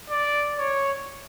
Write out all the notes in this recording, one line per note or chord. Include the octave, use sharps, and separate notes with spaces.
D5
C#5